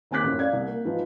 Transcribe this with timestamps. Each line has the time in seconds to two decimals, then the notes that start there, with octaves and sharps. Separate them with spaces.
0.11 D#2 C4 G#5 D6 F#6 B6
0.24 A1 F#2
0.39 D5 F5 G#6
0.53 C2
0.67 A#3
0.85 G#2 E3 F3